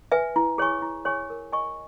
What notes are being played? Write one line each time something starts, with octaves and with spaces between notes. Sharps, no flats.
B4 E5 G#5
E4
G#4 C#5 G#5 C#6
E4
G#4 C#5 G#5 C#6
A#4
D#5 G#5 C#6